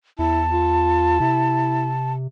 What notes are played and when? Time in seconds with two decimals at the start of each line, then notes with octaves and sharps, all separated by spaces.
0.19 E2 E4 A5
0.52 F4
1.20 C3 E4